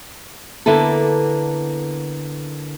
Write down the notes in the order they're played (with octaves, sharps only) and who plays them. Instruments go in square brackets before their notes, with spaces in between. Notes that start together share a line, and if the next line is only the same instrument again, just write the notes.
[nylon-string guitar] D3 A#3 B3 E4 A4